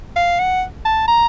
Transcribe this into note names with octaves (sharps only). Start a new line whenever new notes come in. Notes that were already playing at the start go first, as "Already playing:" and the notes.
F5
F#5
A5
A#5